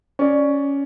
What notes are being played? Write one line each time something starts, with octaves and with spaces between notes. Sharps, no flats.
C#4 D5